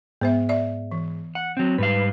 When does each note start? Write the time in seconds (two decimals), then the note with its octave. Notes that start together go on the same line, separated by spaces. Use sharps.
0.21 G#2 B3 C5 E5
0.49 D5 E5
0.92 E3
1.35 F#5
1.57 F#3 C4
1.78 G#2 G3 B4 F5